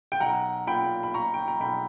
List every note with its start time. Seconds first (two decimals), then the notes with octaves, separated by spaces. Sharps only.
0.12 G5
0.20 B1 F#5 A#5
0.67 A#2 G5 B5
1.03 B5
1.14 A#2 A#5 C#6
1.34 G5
1.48 A#5
1.60 B1 G5 B5